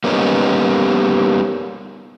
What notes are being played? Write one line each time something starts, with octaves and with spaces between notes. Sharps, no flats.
G3 A#3 B3 C#4 D#4